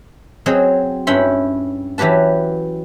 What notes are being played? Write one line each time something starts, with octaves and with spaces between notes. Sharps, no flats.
F#3 C4 G#4 C5 D#5
G2 C#4 E4 G5 B5 C6
E3 F#3 G4 B4 A5